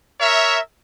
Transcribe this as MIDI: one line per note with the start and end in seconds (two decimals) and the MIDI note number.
0.20 0.58 70
0.20 0.58 73
0.20 0.58 76